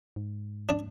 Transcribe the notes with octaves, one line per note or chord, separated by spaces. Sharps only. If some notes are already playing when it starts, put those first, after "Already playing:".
G#2
D4 D5